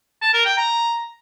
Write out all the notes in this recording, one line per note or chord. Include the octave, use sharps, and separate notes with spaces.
A5
A#4
G5
A#5